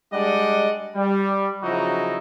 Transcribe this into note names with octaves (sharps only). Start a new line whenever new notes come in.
G3 G#3 D4 D5 D#5 F#5
G3
C#3 F3 F#3 D#4 E4 F#4